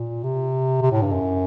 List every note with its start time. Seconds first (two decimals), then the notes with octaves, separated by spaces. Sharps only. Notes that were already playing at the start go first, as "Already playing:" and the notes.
Already playing: A#2
0.24 C3
0.82 C3
0.92 A2
1.02 G2
1.12 F#2